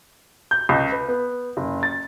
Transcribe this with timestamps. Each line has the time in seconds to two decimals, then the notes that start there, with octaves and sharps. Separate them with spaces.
0.51 G6
0.69 C#2
0.92 B4
1.08 B3
1.57 F#1
1.83 A6